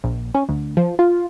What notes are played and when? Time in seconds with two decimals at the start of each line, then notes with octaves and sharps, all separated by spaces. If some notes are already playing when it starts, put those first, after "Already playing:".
0.04 A#1
0.34 C#4
0.49 D2
0.77 F3
0.99 F4